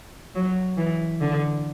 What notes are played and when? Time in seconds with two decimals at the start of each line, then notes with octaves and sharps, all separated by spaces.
0.35 F#3
0.77 E3
1.21 D3